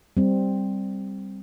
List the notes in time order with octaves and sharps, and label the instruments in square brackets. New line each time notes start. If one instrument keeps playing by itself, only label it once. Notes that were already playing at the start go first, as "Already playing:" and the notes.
[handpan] G3 C4